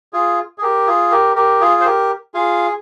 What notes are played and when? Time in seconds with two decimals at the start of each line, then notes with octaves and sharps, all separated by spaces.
0.13 F4 G#4
0.58 G#4
0.62 G4 A#4
0.87 F4 G#4
1.11 G4 A#4
1.36 G4 A#4
1.60 F4 G#4
1.80 C5
1.85 G4 A#4
2.34 F4 G#4